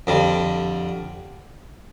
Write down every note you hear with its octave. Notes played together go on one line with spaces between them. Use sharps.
F2 D3 G3